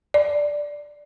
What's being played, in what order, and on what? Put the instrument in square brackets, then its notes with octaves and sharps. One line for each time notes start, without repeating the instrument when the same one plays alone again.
[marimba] D5